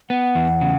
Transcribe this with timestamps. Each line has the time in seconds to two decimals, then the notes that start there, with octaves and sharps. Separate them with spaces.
0.10 B3 F#5
0.35 E2
0.61 C#3